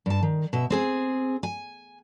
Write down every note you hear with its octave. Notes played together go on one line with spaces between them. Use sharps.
G2 A5
D#3
B2 E5
C4 G#4 G#5
G#5